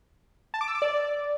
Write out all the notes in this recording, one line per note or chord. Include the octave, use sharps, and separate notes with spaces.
A5
D6
E6
D6
D5